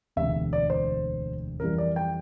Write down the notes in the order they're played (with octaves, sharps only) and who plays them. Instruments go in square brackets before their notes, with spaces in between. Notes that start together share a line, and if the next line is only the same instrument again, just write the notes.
[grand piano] E1 D2 C3 E5
D5
C5
F2 E3 G3 A#4
D5
G5